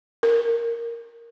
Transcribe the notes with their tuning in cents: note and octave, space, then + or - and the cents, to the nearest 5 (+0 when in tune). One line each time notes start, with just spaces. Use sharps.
A#4 +0